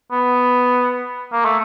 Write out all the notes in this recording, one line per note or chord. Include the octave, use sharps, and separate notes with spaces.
B3
A#3
A3